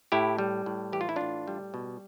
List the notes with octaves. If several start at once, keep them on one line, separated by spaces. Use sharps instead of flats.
A2 E4 G4
G3
A2
E3 G4
F4
E4
A2 D4 F4
G3
B2